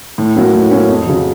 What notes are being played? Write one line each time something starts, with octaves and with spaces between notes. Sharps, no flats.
A2
F#3 A#3 C#4
A2
F#3 A#3 C#4
F2
C#3 F#3